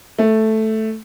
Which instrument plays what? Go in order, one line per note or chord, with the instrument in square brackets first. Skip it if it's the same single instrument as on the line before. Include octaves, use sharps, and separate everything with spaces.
[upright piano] A3